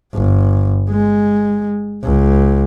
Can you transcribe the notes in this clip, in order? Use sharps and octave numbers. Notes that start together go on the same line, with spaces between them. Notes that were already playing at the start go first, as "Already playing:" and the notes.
G1
G#3
C#2